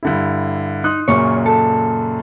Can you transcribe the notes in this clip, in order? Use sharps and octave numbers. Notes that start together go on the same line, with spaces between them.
G2 D3 E4
D#4 C6 D#6 F#6
F#2 A#2 C#3 C#5
A4